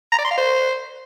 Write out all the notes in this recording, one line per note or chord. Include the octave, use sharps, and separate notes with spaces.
A#5
D5
C6
F5
C5